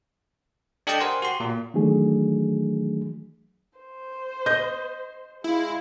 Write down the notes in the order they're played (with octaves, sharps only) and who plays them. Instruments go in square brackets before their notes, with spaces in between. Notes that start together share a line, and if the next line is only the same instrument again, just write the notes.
[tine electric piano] D4 G4 A4 D#5 G5 A5
A#4 C5 F#5 G#5 C6 G#6
F#4 G4 C6
A#2
[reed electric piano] D#3 E3 F#3 A3 D4 G#4
[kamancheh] C5
[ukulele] D#5 [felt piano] G6
[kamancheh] G#3 F5 [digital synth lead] E4